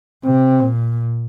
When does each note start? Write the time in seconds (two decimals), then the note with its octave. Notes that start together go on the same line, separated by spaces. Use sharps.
0.24 C3 C4
0.60 A#2